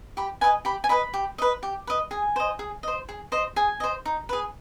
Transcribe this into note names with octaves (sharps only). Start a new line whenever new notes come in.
G4 B5
B4 D#5 G#5
G4 B5
G#5
B4 D#5 B5
G4
B4 D#5
G4
B4 D#5
G#4 G#5
C5 D#5
G#4
C5 D#5
G#4
C5 D#5
G#4 G#5
C5 D#5
D#4
G#4 B4